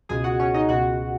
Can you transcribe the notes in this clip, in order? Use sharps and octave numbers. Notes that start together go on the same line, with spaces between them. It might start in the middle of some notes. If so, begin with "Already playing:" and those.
C#2 B2 G#3 G#4 G#5
F#4 F#5
C#4 C#5
D#4 D#5
C#2 B2 G#3 F#4 F#5